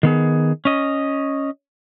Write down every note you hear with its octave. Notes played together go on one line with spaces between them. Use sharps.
D#3 B3 G#4
C#4 D#5